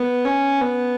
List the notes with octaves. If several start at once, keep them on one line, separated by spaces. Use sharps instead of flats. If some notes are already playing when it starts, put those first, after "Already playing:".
Already playing: B3
C#4
B3